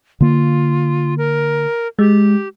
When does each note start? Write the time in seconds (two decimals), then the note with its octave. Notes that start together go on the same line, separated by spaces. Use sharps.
0.21 D3 A#3 F4
1.18 A#4
1.99 G#3 G4